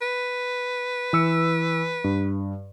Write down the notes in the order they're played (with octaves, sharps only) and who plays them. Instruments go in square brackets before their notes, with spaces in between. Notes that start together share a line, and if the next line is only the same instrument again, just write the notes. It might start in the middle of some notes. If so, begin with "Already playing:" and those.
[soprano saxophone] B4
[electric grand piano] E3 E6 C#7
G2